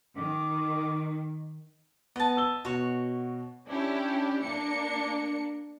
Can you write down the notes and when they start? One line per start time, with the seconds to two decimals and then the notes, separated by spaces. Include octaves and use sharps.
0.17 D#3 D6
2.16 B3 D#5 A5
2.37 E6 G7
2.65 B2 F#4 C#5
3.67 C#4 D4 E4 G4
4.44 A#3 D4 C#7